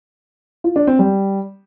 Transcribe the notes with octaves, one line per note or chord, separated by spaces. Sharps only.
F4
D4
C4
G3